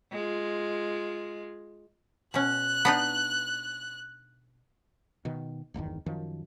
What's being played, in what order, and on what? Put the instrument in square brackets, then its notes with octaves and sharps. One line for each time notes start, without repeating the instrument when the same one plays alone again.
[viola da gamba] G#3 F4
[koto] B2 C#4 [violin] F#6
[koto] B3 D4 D#4
[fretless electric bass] B2 D#3
D1 G1 E2 D#3
F#2 D#3 F3